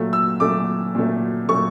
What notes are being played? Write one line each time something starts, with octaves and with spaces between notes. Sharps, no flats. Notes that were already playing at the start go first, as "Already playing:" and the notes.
Already playing: A#2 F#3 A3
E6
A#2 F#3 A3 D6
A#2 F#3 A3
A#2 F#3 A3 C#6